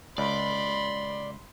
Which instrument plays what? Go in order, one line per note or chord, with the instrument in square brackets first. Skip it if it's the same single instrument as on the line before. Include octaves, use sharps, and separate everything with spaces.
[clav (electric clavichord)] C#2 [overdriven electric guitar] D5 [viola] B5 C6